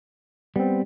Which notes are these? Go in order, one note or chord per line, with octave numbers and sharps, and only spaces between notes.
G3 B3 C4